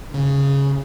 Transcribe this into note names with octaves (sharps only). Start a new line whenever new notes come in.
C#3